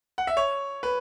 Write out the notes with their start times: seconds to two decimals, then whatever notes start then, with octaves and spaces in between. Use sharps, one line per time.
0.18 F#5
0.27 E5
0.37 C#5
0.83 B4